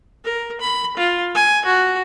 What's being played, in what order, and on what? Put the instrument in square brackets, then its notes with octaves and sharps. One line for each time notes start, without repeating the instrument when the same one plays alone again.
[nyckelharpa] A#4
B5
F4
G#5
F#4